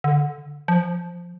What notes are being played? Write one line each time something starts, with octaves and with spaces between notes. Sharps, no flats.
D3
F3